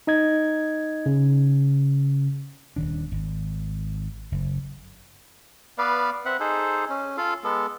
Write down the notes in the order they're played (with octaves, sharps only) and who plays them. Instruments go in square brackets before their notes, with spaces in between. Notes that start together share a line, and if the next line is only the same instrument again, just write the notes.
[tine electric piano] D#4 D#5 G#6
C#3
[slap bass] D#1 D#3 D4
G#1
F#1
[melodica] B3 B4 D5 F5
C4 E5 F#5
D#4 G#4 A4 C5
C#4
F4 A4 F5
G#3 B3 A4